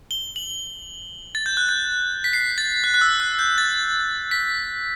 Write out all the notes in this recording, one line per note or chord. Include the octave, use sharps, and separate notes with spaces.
G7
F#7
A6
G6
F#6
G6
B6
C7
A6
F#6
F#6
E6
F#6
G6
A6
B6